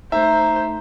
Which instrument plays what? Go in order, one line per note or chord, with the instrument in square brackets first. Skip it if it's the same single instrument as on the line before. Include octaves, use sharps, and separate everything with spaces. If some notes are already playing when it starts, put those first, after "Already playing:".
[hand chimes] A3 D#4 [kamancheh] C5 [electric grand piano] E5 [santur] A#5